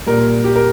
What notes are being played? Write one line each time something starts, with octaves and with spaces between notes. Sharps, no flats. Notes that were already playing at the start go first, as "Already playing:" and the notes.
A#2 G3 A#4
G4
A#4